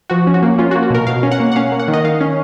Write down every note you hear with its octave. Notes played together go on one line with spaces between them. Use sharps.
F3 F#4
C#4
F#4
A#3
C#4 F4
F#4
A#3
F#4
B2 A#4
B2 F5
C#4
F#5
A#3
F#5
C#4 F5
A#3
F#5
D#3
D#5
D#3 F5
C#4